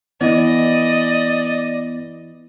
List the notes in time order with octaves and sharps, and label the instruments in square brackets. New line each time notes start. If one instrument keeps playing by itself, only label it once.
[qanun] E3 [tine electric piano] B3 [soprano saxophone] D5 [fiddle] D#5